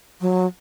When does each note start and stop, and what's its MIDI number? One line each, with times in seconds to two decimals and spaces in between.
0.21 0.46 54